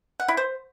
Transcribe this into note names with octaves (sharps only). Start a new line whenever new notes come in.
F#5
E4
C5